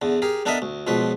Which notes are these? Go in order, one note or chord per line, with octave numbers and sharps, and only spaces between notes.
E2 D3
G4 G#4 A#4
B3 D4 A4 A#4 D#5 E5
D2
C#2 B2 F3 B4